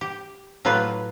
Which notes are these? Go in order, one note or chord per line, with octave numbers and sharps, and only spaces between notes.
G4
A2 F#3 F4 G4 B4